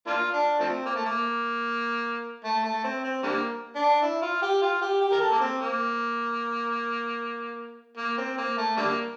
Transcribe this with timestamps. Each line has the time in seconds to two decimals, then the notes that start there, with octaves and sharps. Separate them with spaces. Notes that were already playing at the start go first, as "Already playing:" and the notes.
0.07 A#3 D4 F4
0.33 D4
0.60 F3 A3 C4
0.86 A#3
0.96 A3
1.05 A#3
2.44 A3
2.64 A3
2.84 C4
3.04 C4
3.23 D3 G3 A#3
3.76 D4
4.02 E4
4.22 F4
4.42 G4
4.62 F4
4.82 G4
5.01 G4
5.12 A#4
5.21 A4
5.31 A#3
5.41 C4
5.61 A#3
7.97 A#3
8.18 C4
8.38 A#3
8.57 A3
8.77 D3 G3 A#3